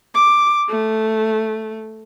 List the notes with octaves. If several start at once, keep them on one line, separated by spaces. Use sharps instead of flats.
D6
A3